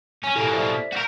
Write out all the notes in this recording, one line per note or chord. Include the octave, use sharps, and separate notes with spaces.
C#4 G#5
B2 A#3 E4 G4 A4
C5 D5 E5
B6
F#4 A#4 A#5 G6